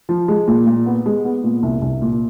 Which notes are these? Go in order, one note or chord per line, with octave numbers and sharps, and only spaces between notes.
F3
G#3
A#2
A#2
B3
G#3
B3
A#2
C2
C2
A#2